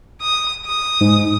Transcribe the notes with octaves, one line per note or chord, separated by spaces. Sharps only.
D#6
D#6
G#2